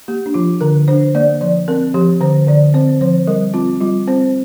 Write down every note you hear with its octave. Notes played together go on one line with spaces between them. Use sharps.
A#3 G4
D4
F3 F4
D3 A#4
D4 C5
A#3 D5
F3 D5
C4 A#4
F3 G4
D3 C5
D3 D5
C4 C5
F3 C5
G3 A#4
C4 F4
G3 F4
C4 C5